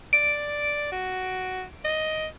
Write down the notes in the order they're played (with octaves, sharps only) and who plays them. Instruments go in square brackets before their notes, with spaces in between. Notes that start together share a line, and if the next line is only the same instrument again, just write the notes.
[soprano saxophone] D5 [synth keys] D7
[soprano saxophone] F#4
D#5